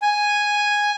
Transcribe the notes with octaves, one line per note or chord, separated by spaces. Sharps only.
G#5